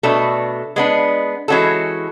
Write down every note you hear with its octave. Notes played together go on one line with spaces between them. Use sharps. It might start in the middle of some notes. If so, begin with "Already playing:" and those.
B2 A3 D4 A4
G#3 B3 D4
E3 G#3 C#4 F#4 A4